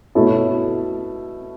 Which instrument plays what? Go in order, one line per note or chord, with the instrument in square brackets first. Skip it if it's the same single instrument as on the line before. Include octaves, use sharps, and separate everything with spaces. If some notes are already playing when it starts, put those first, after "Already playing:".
[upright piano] B2 A3 E4 A4 C#5